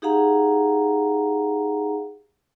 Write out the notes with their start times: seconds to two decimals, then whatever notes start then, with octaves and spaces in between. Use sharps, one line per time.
0.02 D#4 G4 G#4 F5 F#5 A#5